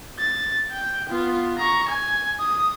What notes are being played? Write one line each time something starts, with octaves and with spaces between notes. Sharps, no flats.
A6
G5
B3 F4
A#5 C#6
G#5
D#6